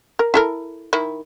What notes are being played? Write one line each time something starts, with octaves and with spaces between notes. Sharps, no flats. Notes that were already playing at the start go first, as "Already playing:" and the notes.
A#4
E4 A4 A#4
D#3 E4